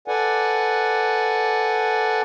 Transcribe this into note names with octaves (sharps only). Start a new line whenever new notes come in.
A4 B4 D5 F#5 G#5